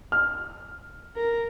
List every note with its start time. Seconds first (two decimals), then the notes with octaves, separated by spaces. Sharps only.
0.12 F6
1.16 A#4